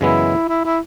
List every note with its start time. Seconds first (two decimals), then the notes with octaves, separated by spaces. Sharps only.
0.01 F#2 C#3 E3 G#3 B3 E4
0.49 E4
0.65 E4